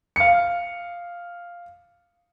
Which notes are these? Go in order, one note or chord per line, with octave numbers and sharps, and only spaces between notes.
F5 C#7